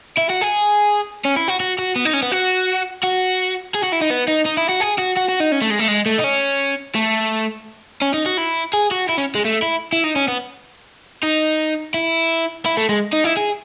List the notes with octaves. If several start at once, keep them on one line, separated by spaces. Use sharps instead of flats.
E4
F#4
G#4
C#4
E4
F#4
F#4
F#4
B3
D#4
C#4
B3
F#4
F#4
G#4
F#4
E4
D#4
B3
D#4
D#4
E4
F#4
G#4
F#4
F#4
F#4
D#4
C#4
A3
G#3
A3
G#3
A3
D#4
C#4
A3
C#4
D#4
F#4
E4
G#4
F#4
E4
C#4
G#3
A3
E4
E4
D#4
C#4
B3
D#4
E4
E4
A3
G#3
D#4
E4
G#4